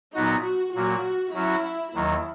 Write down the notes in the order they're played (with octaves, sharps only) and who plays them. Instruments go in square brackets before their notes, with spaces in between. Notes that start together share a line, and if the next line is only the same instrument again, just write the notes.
[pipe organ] A#2 F#3 B3 F#4 [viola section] D#4
[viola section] F#4
[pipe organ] A#2 F#3 A#3 [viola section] F#4
[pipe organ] F#3 C#4 F#4 [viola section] E4
[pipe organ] D#2 D#3 F#3 [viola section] E4